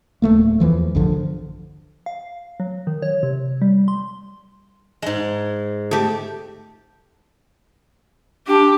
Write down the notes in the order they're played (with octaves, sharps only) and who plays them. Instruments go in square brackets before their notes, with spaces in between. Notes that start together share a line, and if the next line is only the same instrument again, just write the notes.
[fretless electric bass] D1 C2 A3 A#3
E2 E3 F3
A#1 G2 D3 F3
[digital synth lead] F5
F#3
D#3
C#5
C3
G3
C6
[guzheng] G#2 G#3
[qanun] A3 G4
[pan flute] D4 [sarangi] G4